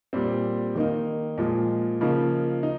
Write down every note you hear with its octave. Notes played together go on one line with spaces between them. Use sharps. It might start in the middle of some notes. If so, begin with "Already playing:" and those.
A#2 G3 C4
D#3 A#3 D#4
A#2 F3 G#3
C#3 F3 A#3 D#4
D#4